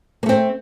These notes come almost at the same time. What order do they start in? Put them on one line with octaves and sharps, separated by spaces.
A#3 A3 C4